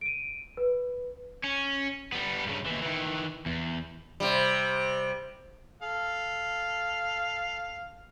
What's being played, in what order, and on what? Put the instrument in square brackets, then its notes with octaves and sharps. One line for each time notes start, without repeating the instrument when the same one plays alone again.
[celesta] D7 D#7
B4
[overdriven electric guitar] C#4
G3 B3
G2 C#3
D#2 E3
D#3 E3
E2
[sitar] C3 G3
[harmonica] A4 F5